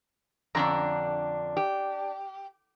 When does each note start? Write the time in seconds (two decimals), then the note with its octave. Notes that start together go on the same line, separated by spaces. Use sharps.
0.55 F2 D3 C#4 D4 A#5
1.57 G4